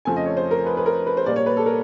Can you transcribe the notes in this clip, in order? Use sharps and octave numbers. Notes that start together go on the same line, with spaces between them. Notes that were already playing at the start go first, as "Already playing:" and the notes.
F2 C#3 F3 A3 C4 G#5
D#5
C#5
C5
A#4
B4
B4
A#4
B4
C5
A#2 G3 A#3 D5
C#5
B4
A4
A#4